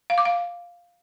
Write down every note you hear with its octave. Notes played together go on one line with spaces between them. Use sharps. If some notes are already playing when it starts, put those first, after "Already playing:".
F5
D6
F5